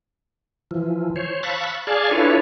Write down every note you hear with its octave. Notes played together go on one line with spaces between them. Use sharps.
E3 F3
C5 C#5
F5 A5 B5 C#6 E6 F#6
G#4 D5 F5 G#5 A5
D4 E4 F4 A4 B4 C#5